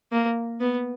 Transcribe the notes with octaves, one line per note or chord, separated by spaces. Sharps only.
A#3
B3